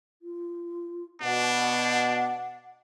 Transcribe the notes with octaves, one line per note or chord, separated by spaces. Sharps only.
F4
B2 D4 F#5